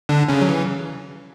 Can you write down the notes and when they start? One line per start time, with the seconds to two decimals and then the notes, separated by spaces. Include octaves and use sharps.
0.09 D3 D4
0.28 C#3 C#4
0.41 F#3
0.49 E3